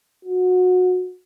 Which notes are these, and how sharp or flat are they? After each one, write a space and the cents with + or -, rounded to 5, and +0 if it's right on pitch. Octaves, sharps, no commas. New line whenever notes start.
F#4 -20